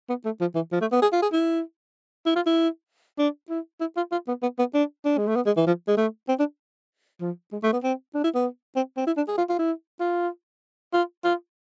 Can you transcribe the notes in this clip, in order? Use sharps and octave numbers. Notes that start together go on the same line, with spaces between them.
B3
A3
F3
E3
F3
A3
B3
G#4
F4
G#4
E4
E4
F4
E4
D4
E4
E4
F4
F4
B3
B3
B3
D4
D4
G#3
A3
B3
G#3
E3
F3
G#3
A3
C4
D4
F3
G#3
A3
B3
C4
D4
E4
B3
C4
C4
E4
D4
G#4
F4
F4
E4
F4
F4
F4